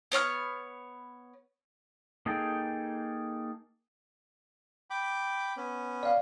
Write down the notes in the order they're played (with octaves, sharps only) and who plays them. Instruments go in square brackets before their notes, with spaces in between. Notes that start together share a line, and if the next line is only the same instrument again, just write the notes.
[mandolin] B3 C#5 F#5 F6
[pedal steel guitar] A#3 D#4 G#4 A4 G5
[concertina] G5 B5 D6
B3 C#4
[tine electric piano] D5 F5